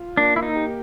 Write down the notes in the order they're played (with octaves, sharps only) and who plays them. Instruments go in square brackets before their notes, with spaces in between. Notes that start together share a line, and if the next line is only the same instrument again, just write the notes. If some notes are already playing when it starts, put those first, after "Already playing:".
Already playing: [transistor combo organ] F4
[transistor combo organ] A#3 [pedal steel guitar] D4
[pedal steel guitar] E4
D#4
[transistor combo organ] G4